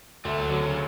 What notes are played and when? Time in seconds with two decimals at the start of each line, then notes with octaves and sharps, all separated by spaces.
0.25 D2 A3
0.37 F#3
0.50 D3 F#3
0.63 C#3